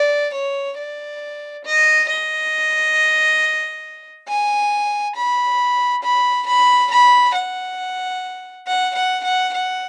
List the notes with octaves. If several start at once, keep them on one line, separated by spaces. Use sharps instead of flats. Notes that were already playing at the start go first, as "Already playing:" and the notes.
Already playing: D5
C#5
D5
D#5
D#5
G#5
B5
B5
B5
B5
F#5
F#5
F#5
F#5
F#5